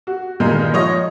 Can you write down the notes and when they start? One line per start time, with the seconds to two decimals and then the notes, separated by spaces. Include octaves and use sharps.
0.07 F#4
0.40 G2 A#2 D#3 G#3 A#3 D#4
0.73 F3 C#5 D#5 C#6